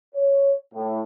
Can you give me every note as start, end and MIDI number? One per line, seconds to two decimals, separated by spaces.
0.15 0.55 73
0.74 1.02 45